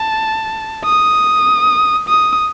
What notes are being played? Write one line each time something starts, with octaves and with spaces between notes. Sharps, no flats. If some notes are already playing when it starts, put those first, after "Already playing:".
Already playing: A5
D#6
D#6